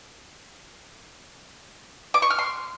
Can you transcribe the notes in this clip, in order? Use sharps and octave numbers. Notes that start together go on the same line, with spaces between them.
D6
C#6
F6
C6